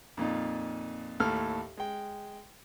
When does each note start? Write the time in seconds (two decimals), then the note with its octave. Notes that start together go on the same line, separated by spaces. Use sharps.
0.17 F2 A#2 D#4
1.20 D#2 A2 A4 F6
1.77 G#3 G5